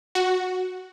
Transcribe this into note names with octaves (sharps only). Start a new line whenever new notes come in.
F#4